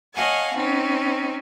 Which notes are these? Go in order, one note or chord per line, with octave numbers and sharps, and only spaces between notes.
C#5 D#5 F5 F#5 G#5 A5
C4 C#4 D#4